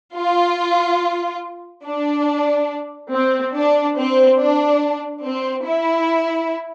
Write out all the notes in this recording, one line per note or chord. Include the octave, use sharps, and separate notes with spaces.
F4
D4
C4
D4
C4
D4
C4
E4